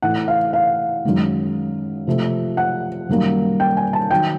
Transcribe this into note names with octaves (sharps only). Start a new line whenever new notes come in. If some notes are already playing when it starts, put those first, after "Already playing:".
A2 E3 A3 F#5
F5
F5
F#2 D#3 G#3
C3 F3 A3
F#5
F#2 D#3 G3 A#3
G5
G#5
A5
D#3 F#3 G5